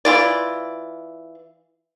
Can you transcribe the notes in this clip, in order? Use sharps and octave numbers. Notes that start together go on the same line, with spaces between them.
E3 F4 D5